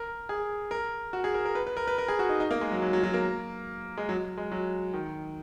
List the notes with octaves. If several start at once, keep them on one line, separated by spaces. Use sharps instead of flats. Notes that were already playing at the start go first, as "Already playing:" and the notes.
Already playing: A#4
G#4
A#4
F#4
G#4
A#4
A#4
B4
B4
A#4
B4
A#4
G#4
F#4
D#4
D#4
A#3
G#3
F#3
F#3
F#3
F#3
A#3
G#3
F#3
G#3
F#3
D#3